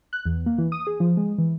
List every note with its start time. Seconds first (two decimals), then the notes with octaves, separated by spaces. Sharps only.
0.13 F#6
0.25 E2
0.46 A#3
0.58 E3
0.72 D#6
0.87 G#4
1.00 F3
1.17 G#3
1.38 E3